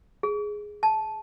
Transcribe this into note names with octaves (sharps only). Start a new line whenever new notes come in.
G#4
A5